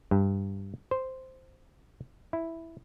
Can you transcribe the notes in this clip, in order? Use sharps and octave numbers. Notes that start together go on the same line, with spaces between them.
G2
C5
E4